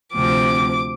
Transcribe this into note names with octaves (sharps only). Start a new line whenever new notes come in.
D2 C3 F3 C4 D6